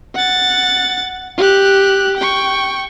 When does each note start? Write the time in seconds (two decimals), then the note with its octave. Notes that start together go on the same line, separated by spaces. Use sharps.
0.15 F#5 A6
1.38 G4 F#6
2.17 G5 C#6